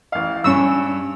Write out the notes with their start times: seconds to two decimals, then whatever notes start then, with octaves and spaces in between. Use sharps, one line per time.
0.12 A1 F5
0.44 G2 C#4 C#6 E6